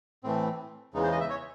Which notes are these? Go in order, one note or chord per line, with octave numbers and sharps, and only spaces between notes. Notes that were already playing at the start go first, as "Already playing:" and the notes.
A2 E3 A3 C4
E2 C#3 E3 G#3 D#4
C5
D#5
E5
C#5